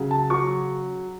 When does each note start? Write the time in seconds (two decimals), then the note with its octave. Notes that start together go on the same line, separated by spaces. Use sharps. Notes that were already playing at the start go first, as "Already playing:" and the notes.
Already playing: C#3 F#3
0.11 A5
0.30 F#3 C#6